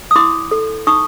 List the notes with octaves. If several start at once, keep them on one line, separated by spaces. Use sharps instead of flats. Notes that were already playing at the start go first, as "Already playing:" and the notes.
D#6
E4 C6 D6
A4
D#4 C#6 D#6